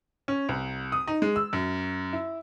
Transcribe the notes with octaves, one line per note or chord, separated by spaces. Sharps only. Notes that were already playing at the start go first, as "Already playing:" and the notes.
C#4
C2
D#6
D#4
G#3
E6
F#2
E4